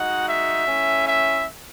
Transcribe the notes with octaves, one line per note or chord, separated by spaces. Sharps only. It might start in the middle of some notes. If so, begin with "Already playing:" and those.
Already playing: G#3 D#4 F#4 F#5
E5
A3 C#4 E4
E5